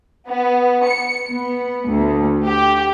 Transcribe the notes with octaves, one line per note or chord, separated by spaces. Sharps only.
B3
C#7
B3
D2
G4